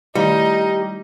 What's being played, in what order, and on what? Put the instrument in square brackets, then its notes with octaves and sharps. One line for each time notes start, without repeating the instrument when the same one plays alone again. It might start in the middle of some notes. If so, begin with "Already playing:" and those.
[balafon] D#3 A3 E4 [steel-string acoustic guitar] G3 [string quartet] D#4